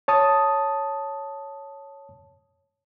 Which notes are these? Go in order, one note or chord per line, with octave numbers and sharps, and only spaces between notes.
C#5 A5 D#6